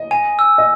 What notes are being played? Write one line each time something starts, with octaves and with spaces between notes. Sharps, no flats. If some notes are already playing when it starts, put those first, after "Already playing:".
Already playing: D#5
G#5
E6
D#5